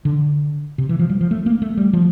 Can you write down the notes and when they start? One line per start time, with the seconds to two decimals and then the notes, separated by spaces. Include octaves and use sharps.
0.05 D3
0.78 C3
0.89 E3
0.99 F3
1.09 G3
1.21 F3
1.31 A3
1.46 A#3
1.62 A3
1.77 G3
1.93 F3